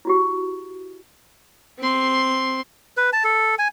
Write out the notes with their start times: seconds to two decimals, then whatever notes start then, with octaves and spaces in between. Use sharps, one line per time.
0.05 E4 F#4 G4
1.79 C4 C6
2.97 B4
3.13 A5
3.24 A4
3.58 G#5